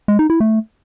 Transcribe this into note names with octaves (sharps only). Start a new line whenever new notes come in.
G#3
D#4
E4
A3